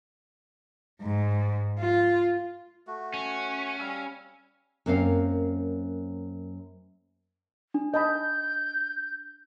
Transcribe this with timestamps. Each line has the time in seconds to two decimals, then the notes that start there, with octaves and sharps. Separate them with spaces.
1.02 G#2
1.79 F4
2.87 A3 F#4
3.14 C#4
3.80 G3 F5 E6
4.86 F#2 A#3 C4 C#4 F5
7.74 D4
7.94 D#5 A5 B5 G6